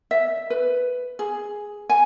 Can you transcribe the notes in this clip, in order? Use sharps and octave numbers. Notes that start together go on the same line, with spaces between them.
E5
B4
G#4
G#5